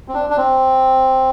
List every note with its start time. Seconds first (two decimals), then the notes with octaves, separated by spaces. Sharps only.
0.08 C4
0.14 D4
0.30 D4
0.37 C4